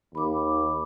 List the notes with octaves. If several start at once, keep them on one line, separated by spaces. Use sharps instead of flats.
D#2 B5 D6